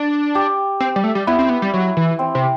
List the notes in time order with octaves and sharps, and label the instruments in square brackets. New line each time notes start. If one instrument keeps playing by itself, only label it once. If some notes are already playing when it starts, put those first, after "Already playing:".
Already playing: [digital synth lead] D4
[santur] G4
[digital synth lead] C4
G3
A3
G3
[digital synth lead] B3 [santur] E4
[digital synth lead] C4
B3
G3
F#3
E3
[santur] C4
[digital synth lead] C3